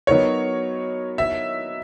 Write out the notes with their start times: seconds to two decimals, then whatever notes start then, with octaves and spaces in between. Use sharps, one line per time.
0.07 F#3 B3 D#4 F#4 A#4 C#5
1.18 E5